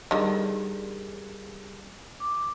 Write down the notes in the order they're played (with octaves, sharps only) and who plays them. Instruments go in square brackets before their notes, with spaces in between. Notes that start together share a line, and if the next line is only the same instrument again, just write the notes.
[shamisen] D3 D#3 [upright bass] G3 [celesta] G4 G#4 A#4
[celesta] D6